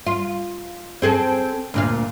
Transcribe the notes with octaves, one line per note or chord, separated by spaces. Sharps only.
F4
C4 G#4 A4
D2 A#2 F5